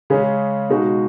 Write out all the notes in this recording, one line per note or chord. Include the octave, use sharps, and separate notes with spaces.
C#3 G#3 C#4
B2 G#3 D#4 F#4